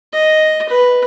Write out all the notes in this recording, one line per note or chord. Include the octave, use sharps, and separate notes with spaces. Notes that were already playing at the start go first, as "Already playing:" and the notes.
D#5
B4